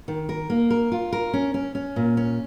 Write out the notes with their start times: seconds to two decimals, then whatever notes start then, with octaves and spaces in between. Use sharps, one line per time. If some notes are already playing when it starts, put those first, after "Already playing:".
0.08 D#3
0.29 A#4
0.50 A#3
0.70 A#4
0.92 F4
1.12 A#4
1.34 C#4
1.54 C#4
1.75 C#4
1.96 A#2
2.17 C#4